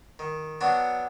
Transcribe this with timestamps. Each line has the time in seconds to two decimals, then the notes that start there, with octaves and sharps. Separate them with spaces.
0.19 D#3
0.61 F#3 B3 D4 F#4